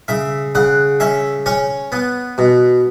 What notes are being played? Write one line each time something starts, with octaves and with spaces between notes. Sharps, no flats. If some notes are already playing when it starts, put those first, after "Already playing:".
C#3 E5
C#3 F#5
C#4 E5
C#4 C#5
B3
B2